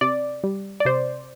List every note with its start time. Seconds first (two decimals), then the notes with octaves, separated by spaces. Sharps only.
0.01 C3 D5
0.44 G3
0.80 D5
0.85 C3 C5